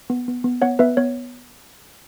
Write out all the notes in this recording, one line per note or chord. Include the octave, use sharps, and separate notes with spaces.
B3
B3
B3
B3 C#5 F#5
B3 B4 E5
B3 C#5